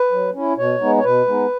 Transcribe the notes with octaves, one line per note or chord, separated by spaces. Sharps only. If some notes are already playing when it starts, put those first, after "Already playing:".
Already playing: B4
F#3
C#4 E4
B2 C#5
G#3 B3 D#4
C#5
B2 B4
G#3 B3 D#4